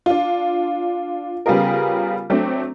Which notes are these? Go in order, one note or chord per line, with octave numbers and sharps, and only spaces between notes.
D4 F4
C#3 G3 B3 F4 G#4 A#4
F#3 A3 C4 D4